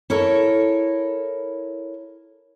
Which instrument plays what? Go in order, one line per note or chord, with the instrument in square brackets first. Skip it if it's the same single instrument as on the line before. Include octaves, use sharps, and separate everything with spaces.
[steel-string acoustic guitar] E4 A4 A#4 C#5